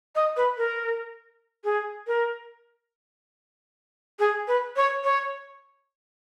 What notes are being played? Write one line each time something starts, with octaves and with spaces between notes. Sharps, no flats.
D#5
B4
A#4
G#4
A#4
G#4
B4
C#5
C#5